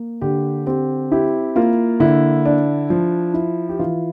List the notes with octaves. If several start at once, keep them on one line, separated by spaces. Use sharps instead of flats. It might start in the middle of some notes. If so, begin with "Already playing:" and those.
Already playing: A#3
D3 G4
C4 G4
E4 G4
A#3 F4
D3 E4
D4
F3
E4
G4
E3 F4